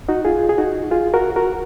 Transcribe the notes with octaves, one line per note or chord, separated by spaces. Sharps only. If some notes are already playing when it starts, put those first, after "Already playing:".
D#4 F#4
F4 G#4
G#4
D#4 F#4
F4 G#4
F#4 A#4
F#4 A#4